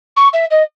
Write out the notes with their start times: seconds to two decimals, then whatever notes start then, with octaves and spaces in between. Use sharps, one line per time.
0.16 C#6
0.33 E5
0.50 D#5